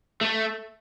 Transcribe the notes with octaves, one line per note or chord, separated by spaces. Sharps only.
A3